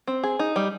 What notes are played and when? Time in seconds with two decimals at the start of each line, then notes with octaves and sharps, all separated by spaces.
0.07 C4
0.23 G#4
0.39 D#4
0.56 G3